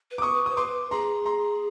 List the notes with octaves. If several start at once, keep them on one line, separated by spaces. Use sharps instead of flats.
B4
D6
C#6 D#6
B4
C5 D#6
B4 C6 D6
G#4 A#5 C6
A#5 C6